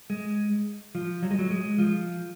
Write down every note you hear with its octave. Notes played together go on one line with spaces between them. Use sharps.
G#3
F3
F#3
G#3
F#3
G#3
F3